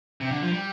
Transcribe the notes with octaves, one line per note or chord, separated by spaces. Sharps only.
C3
D3
F3
G3